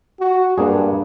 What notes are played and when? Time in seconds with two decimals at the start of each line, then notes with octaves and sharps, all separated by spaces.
0.20 F#4
0.58 G2 A#3 D4 G#4